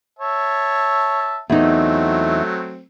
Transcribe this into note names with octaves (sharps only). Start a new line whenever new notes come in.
C#5 E5 A5
E2 F#3 A3 C4 D#4